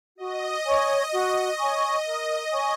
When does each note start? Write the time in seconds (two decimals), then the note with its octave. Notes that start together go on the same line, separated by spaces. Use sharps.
0.18 F#4 D#5
0.65 C#5 G#5 C#6
1.12 F#4
1.58 C#5 G#5 C#6
2.05 A#4
2.52 C#5 G#5 C#6